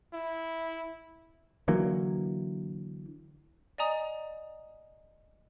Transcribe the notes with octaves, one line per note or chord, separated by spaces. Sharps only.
E4
D3 E3 F#3 A#3
D5 D#5 G#5 A#5 D#6